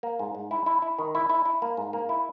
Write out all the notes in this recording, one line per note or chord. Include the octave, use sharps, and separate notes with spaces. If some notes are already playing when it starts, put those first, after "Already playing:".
A#3
G#2
G#2
E4
E4
E4
D#3
E4
E4
E4
A#3
G#2
A#3
E4